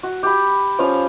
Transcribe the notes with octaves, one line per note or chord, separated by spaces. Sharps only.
F#4
G4 B5
F3 C#4 F5